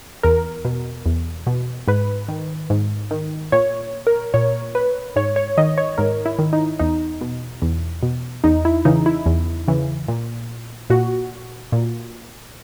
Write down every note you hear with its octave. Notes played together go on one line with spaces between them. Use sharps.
E2 A#4
B2
E2
B2
G#2 B4
D#3
G#2
D#3
A#2 C#5
A#4
A#2 C#5
B4
G#2 C#5
C#5
D#3 D#5
C#5
G#2 A#4
E4
D#3
D#4
E2 D#4
B2
E2
B2
E2 D#4
E4
C#3 E3 D#4
E4
E2
C#3 E3
A#2
A#2 F#4
A#2